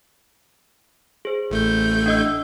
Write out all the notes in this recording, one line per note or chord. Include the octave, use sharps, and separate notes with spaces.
G#4 C5
A1 A3 G6
D4 D#5 E6